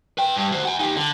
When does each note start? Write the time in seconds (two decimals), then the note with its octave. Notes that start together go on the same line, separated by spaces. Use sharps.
0.18 B4 G5
0.36 G2
0.52 F#4 C5
0.65 F#5 G#5
0.79 D#4 G4
0.97 D3